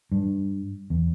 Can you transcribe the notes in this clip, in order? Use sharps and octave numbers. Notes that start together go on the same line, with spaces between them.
G2
E2